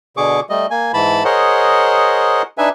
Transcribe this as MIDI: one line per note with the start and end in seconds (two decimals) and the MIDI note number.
0.17 0.40 47
0.17 0.40 50
0.17 0.40 68
0.17 0.40 85
0.17 0.40 86
0.50 0.66 55
0.50 0.66 57
0.50 0.66 75
0.71 0.92 58
0.71 0.92 80
0.94 1.24 44
0.94 1.24 52
0.94 1.24 81
0.94 1.24 83
1.25 2.42 68
1.25 2.42 70
1.25 2.42 72
1.25 2.42 73
1.25 2.42 75
1.25 2.42 78
2.58 2.69 62
2.58 2.69 63
2.58 2.69 71
2.58 2.69 76
2.58 2.69 80